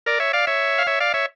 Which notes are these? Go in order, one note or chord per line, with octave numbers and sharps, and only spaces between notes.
A#4 D5
C#5 E5
D5 F5
C#5 E5
F5
C#5 E5
D5 F5
C#5 E5